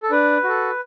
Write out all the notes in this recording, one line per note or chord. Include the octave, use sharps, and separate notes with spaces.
A4
D4 B4
F#4 A4